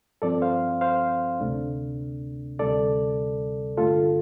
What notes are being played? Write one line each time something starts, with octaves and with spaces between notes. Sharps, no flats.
G2 F3 C4 A4 D5
C5 F5
C5 F5
D2 C3 A3 D4
D2 C3 G3 A4 D5
G2 D3 A3 F4 A4